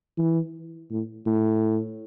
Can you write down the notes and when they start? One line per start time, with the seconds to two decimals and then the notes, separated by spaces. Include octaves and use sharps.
0.18 E3
0.90 A2
1.26 A2